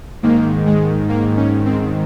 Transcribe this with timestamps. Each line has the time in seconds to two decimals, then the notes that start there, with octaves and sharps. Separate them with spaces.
0.22 G#2 D#3 A#3
0.66 G#3
1.09 A#3
1.37 C#4
1.65 C4